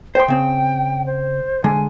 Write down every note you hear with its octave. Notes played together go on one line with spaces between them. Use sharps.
C5 G5 C6
C#3 C4
C5
D3 G#3 G#5